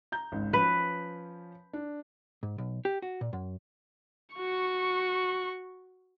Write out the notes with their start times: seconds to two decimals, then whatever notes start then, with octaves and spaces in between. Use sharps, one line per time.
0.12 A#5 G6
0.32 G#1 C#2
0.53 F3 C#4 B4
1.73 D4
2.43 G#2
2.58 B1
2.85 G4
3.02 F#4
3.21 A#2
3.33 F#2
4.35 F#4 C#6